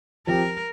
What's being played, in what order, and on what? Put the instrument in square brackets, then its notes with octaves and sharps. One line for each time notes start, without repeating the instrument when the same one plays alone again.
[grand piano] F3 C4 G4 [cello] A#4